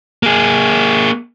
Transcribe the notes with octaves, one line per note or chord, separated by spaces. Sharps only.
A#3 G#4